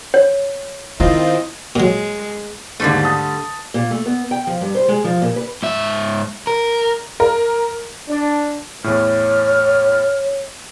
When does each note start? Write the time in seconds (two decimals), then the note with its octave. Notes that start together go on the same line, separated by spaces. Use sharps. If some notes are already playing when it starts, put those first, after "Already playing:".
0.14 C#5
1.00 D#3 C4 E4 F4 D#5
1.76 A#2 F#3 G#3
2.80 D#2 G#2 D3 G3 A3
3.05 A5 D#6 A6
3.74 A#2
3.91 A3
4.06 B3
4.31 G5
4.47 F3
4.61 G2
4.75 C5
4.88 G#3
5.04 F3
5.22 A#2
5.36 B4
5.63 G#2 E5
6.47 A#4
7.20 A#4
8.08 D4
8.84 E2 A2 C#5 F6